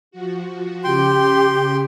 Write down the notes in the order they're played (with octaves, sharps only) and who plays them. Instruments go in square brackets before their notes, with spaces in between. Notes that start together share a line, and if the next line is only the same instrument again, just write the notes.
[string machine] F3 F#4
[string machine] C#3 [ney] G4 [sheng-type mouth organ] G5 C6